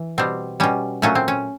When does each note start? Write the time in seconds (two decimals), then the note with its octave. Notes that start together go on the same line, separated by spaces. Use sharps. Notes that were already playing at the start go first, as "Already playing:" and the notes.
Already playing: E3
0.18 B2 G3 C4
0.60 B2 G3 C#4
1.02 A#2 F#3 A3 C#4
1.15 C4
1.28 C#4